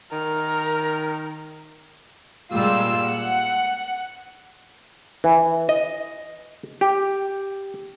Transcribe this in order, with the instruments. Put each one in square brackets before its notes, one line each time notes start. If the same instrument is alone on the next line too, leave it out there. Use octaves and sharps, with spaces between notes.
[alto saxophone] D#3 [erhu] A#4
[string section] A#2 G3 G#3 F4 E6
F#5
[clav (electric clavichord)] E3
D#5
G4